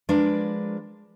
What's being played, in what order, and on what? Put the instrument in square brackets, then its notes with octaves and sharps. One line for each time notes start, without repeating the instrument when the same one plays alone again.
[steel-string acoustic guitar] F3 G#3 D4 A#4 B4